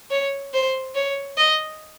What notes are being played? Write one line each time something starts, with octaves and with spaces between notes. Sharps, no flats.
C#5
C5
C#5
D#5